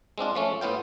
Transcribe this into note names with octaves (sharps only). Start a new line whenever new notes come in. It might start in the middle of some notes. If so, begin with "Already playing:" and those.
G#3 C4 D4 F4
F3 A3 C#4
A2 B3 F4 G5